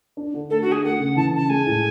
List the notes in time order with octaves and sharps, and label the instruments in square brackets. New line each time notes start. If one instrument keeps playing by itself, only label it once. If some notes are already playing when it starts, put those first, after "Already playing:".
[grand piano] D4
D3
[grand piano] A3 [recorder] A4
[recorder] F#4
[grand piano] D3 [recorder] G#4
[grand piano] A3 [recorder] F#5
[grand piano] C#3
[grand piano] E3 [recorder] A5
[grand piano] C#3 [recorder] A5
[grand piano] G#3 [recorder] G#5
[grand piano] A2